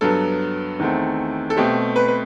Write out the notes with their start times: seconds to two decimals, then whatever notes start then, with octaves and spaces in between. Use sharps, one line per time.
0.01 G2 F#3 B3 A4
0.79 E2 D#3 A3 C4
1.50 A4
1.56 B2 A3 C4 G4
1.96 B4
2.08 B4